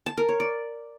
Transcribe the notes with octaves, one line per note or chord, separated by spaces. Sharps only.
A5
A#4
C#5
D5